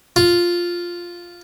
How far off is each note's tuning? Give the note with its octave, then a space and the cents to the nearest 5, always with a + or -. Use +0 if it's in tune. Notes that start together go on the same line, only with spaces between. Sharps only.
F4 +0